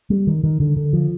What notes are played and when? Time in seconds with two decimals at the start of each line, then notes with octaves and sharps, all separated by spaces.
0.10 G3
0.27 D#3
0.44 D#3
0.60 D3
0.77 D3
0.93 F3